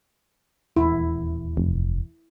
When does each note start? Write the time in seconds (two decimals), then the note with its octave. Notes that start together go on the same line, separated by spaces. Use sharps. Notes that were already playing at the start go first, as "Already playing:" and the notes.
0.76 D#1 E2 E4
1.57 F1